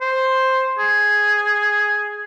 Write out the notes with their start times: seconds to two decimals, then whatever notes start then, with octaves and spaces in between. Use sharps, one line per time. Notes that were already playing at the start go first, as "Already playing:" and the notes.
0.01 C5
0.79 G#4